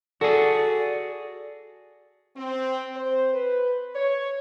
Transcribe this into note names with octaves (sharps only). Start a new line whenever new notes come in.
F#4 G#4 A4 D5
C4
C5
B4
C#5